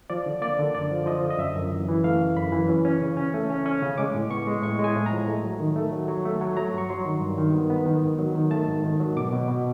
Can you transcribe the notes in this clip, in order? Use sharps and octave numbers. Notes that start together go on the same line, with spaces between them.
F3 D5
D3
A#3 D5
D3
F#2 D5
F3
F3 D#5
D3
D#5
F#2 E5
F#2
E3
E3
A3 F5
C#3
F#2 B5
E3
C#4
C#4
C#3
C#4
A3
C#4
C#4
C#3
G#3 D6
A2
B3 C#6
G#3
A2 C#6
G#3
G#5
A2
A#5
F3
A3
F#3
D#3
A3
F#3
F#3
A3
F#3
F#3 A#5
G2 C#6
F#3 C6
D#3
G2
D#3
B3
B3
D#3
G#2
F#3
D#3
A3 A5
G#2
D#3
F#3
B2 D6
B2
B2